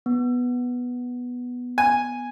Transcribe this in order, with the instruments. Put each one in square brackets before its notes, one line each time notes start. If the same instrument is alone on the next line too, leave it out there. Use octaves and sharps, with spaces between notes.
[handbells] B3
[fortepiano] G#5